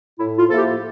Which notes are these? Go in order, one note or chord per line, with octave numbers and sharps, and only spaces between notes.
A2 E4
F4
F3 A#3 E4 A4
G4